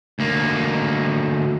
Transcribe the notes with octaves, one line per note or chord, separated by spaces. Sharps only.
D2 A#3